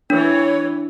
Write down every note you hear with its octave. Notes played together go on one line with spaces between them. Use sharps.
E3 D4 C#5